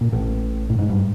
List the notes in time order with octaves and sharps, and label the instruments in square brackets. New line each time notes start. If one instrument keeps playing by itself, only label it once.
[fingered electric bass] A#2
A1 A2
A2
G#2
G2